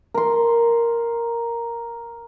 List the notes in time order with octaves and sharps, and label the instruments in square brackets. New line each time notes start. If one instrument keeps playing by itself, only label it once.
[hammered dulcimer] A#4 C6